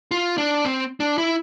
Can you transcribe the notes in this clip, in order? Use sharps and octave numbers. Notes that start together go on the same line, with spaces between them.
F4
D4
C4
D4
E4